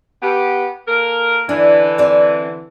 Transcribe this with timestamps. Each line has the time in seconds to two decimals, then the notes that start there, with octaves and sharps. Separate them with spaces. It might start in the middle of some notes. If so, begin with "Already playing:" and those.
0.22 B3 G4
0.88 A#3 A4 A#4
1.49 D3 E3 D4
1.98 C4 D5